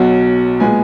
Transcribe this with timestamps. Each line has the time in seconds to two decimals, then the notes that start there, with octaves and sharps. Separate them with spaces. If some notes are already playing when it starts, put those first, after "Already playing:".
Already playing: B1 B2 F#3 F#5
0.60 A#2 G#3 B3 G#5